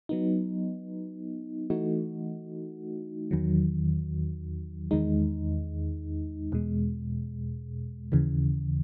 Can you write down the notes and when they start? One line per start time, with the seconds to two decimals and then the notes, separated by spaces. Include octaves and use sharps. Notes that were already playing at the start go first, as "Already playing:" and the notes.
0.09 F#3 B3 D#4
1.70 E3 A3 D#4 F#4
3.31 E2 D#3 F#3
4.91 E2 D#3 G#3 D#4
6.52 E2 B2 G#3
8.12 D#2 C#3 E3